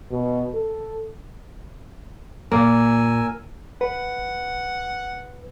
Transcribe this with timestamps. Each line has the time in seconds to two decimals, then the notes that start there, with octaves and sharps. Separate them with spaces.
0.11 B2
0.54 A4
2.52 A#2 A#3 A#4 G#5 E6
3.81 B4 F#5